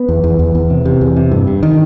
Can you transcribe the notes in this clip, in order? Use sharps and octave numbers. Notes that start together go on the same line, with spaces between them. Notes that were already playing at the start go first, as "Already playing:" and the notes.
Already playing: B3
E2
E2
E2
E2
C3
C3
E2
C3
G2
G2
D#3